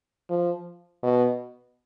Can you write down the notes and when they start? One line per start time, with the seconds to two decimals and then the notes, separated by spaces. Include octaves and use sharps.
0.30 F3
1.03 B2